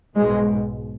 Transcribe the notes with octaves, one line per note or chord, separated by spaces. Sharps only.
B1 G#2 B2 G#3